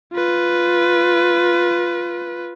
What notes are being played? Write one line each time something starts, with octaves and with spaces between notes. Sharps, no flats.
F4 B4